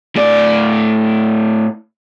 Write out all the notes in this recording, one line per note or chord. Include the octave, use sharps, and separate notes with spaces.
A2 D5